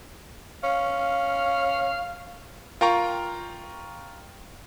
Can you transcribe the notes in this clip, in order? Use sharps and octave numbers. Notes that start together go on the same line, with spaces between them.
C#4 F5
F4 A#4 G5 A#5 C#6